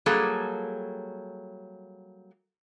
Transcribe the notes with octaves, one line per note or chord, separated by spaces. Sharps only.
F#3 G3 A#3 G#4 A4